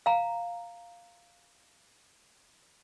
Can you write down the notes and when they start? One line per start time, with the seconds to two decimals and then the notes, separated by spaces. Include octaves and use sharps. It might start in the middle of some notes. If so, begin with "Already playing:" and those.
0.06 F5 A#5